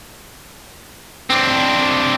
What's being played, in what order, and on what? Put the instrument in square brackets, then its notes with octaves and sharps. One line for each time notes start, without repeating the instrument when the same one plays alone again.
[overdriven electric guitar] C4 D4